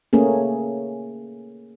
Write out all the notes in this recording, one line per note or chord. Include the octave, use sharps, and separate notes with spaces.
A3 A#3 C#4 G#4